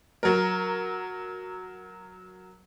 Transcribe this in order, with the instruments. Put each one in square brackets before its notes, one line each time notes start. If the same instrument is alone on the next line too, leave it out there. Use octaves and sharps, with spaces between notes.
[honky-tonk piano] F#3 A#4